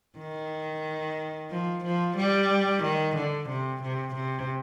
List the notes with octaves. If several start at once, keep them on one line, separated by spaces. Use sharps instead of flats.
D#3
F3
F3
G3
D#3
D3
C3
C3
C3